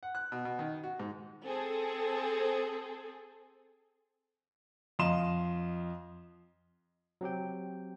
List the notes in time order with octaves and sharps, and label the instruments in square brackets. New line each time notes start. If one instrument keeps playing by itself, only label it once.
[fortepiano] F#5
F#6
B2
B2
D#3
F#4
G#2
[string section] C4 G#4 A4
[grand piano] F2 D#5 F5 C6 E7
[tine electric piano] F#3 C4 G4 G5